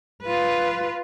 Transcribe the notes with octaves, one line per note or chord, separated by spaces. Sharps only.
F4 B4